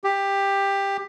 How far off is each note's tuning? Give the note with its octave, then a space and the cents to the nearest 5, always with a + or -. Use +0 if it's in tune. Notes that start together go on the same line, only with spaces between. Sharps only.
G4 +15